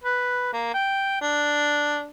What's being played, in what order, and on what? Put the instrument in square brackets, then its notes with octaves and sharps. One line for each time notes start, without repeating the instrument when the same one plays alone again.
[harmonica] B4
A#3
G5
D4